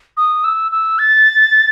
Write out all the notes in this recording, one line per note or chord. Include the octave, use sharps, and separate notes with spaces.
D#6
E6
E6
A6